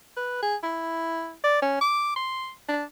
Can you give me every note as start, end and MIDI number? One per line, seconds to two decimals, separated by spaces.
0.17 0.41 71
0.42 0.56 68
0.63 1.34 64
1.44 1.59 74
1.62 1.78 61
1.81 2.14 86
2.16 2.51 84
2.68 2.84 62